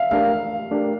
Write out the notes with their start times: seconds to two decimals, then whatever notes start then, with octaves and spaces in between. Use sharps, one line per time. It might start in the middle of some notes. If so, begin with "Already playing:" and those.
Already playing: E5 F5
0.11 A3 D4 G4 A#4 F5
0.71 A3 D4 G4 A#4